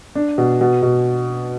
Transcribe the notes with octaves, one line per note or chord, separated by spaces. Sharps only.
D4
B2
B2
B2